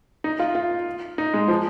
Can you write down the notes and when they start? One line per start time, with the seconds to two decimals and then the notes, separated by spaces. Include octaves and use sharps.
0.24 D#4
0.39 F4
0.55 F4
1.18 D#4
1.34 G#3
1.48 F3